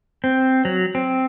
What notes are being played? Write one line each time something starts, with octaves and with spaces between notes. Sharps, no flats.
C4
F#3
C4